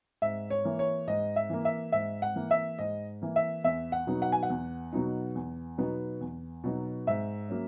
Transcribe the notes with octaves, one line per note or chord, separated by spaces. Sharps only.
G#2 E5
C#5
E3 A#3
C#5
G#2 D#5
E5
E3 A#3
E5
G#2 E5
F#5
E3 A#3
E5
G#2 D#5
E3 A#3
E5
E2 E5
F#5
B2 F#3 B3 D#4
F#5
G#5
F#5
E2
B2 F#3 B3 D#4
E2
B2 F#3 B3 D#4
E2
B2 F#3 B3 D#4
G#2 E5
F#3 A#3 C#4